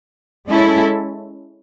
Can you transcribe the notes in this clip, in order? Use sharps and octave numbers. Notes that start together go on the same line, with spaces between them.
G#3 C#4 E4 A4